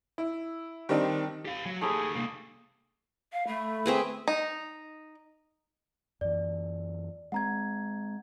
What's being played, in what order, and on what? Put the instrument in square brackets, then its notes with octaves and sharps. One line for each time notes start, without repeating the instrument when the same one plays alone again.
[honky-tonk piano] E4
D#3 G3 C4 D4 D#4
[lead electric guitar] G4 F5
F#3
[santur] A3 B5 E6 [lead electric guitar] D#4 G4 [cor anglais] G#4
[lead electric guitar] C2 A#3
[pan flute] F5
[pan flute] A3 [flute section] A4 B5
[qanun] C4 G#4 B4
[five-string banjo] D#4
[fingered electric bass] F#2 E3 [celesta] D5
[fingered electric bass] G#3 C4 [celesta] F#5 A#5 G#6